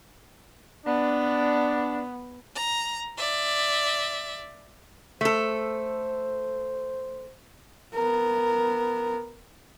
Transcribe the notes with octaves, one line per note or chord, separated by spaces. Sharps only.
B3 D4
A#5
D5 E5
A3 A4 C5
B3 A#4